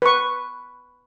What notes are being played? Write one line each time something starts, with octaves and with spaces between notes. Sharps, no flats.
B4 C#6